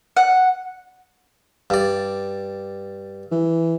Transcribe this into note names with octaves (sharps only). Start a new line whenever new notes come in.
F#5
G2 D5
E3